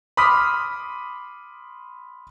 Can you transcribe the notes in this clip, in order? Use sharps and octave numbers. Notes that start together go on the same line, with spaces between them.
B5 C6 D6 D#6 F6 B6